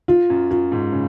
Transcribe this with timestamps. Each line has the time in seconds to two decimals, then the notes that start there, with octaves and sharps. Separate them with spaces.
0.08 F4
0.30 F#2
0.50 F#2 F4
0.72 G#2
0.93 C#3